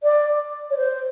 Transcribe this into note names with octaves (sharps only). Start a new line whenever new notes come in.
D5
C#5
C5